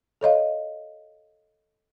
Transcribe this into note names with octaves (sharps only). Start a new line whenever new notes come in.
A4 C#5 D#5 F5